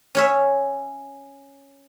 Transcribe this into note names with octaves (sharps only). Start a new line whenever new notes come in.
C#4 C#5 E5